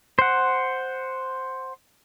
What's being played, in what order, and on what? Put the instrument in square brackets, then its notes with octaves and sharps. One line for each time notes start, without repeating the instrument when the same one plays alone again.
[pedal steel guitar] C5 F#5